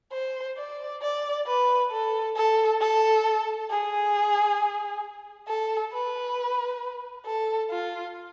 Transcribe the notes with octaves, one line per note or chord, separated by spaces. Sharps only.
C5
D5
D5
B4
A4
A4
A4
G#4
A4
B4
A4
F4